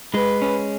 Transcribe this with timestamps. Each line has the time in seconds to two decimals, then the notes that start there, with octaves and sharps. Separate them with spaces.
0.13 G#3 B4
0.42 C#4